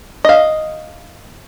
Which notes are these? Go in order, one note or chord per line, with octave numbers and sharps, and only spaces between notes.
D#5 F5